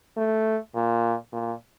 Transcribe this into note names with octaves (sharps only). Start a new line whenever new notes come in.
A3
A#2
A#2